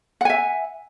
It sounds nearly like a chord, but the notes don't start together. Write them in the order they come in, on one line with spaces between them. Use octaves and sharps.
F#5 G#5 E5